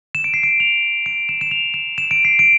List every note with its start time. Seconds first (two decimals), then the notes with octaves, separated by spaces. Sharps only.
0.15 E7
0.24 D7
0.34 C7
0.43 D7
0.60 F7
1.06 D7
1.29 E7
1.41 E7
1.51 F7
1.74 E7
1.98 E7
2.11 D7
2.25 C7
2.39 D7